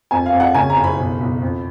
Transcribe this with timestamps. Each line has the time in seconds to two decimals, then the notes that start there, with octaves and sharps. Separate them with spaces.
0.11 F2 G#5
0.26 F5
0.32 F2
0.40 F#5
0.55 C#3 G#5
0.70 A#5
0.77 F#1
0.84 B5
0.98 B1
1.20 B1
1.42 F2